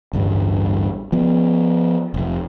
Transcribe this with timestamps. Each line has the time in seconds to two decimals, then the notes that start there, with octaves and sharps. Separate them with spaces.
0.13 A1 D2 G2 G3
1.12 F3 B3
2.14 F1 F2